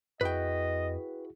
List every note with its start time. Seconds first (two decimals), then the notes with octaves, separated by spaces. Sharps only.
0.21 F2 E4 F#4 G#4 B4 D#5 G5